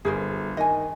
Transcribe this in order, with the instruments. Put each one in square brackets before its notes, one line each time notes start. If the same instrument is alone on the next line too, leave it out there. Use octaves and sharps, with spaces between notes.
[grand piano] G1 [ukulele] G#4 A#4 C5
[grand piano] D#3 [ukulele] D#5 G#5